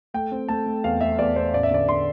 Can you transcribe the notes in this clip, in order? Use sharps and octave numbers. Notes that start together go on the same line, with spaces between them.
A3 G5
C4
A3 A5
A3
E2 F5
A3 E5
E2 D5
E2 C5
A1 D5
E5
D3 D5
D3 C6